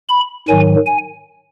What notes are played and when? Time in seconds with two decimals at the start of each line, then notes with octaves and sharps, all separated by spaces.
0.09 B5
0.48 G#2 D#3 F#3 G#5
0.86 G#5